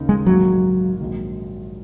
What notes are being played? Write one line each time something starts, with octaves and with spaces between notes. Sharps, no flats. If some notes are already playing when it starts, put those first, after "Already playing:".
Already playing: D#2 C#3 A#3 D#4
G#3
A#1 G#2 D#3 F#3 A#3 F#4
A#1 G#2 D#3 F#3